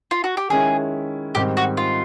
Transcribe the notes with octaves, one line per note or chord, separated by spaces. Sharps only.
F4
F#4
G4
D#3 G#3 C#4 E4 G#4
G#2 D#3 G3 C4 G4
F#4
F4